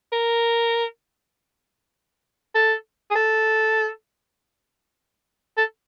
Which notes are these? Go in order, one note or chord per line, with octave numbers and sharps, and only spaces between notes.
A#4
A4
G#4
A4
A4